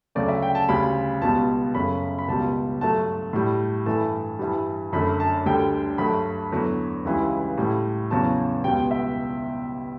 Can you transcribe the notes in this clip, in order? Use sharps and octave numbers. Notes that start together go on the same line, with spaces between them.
D2 C#3 F#3 A3 D5
E5
G5
A5
D2 C#3 G3 B5
C#2 B2 G3 A5
F#2 C#3 F#3 A3 B5
B5
C#2 B2 G3 A5
G2 F#3 A3 A5
A2 G3
G2 E3 A3 A5
G2 E3 G3
F#2 D3 A3 B5
A5
D2 D3 G3 G5
G2 F#3 A3 B5
E2 D3 F#3 A3
C#2 C#3 E3 G3
A2 G3
E2 C#3 F#3 A5
C#2 B2 G3 G5
E5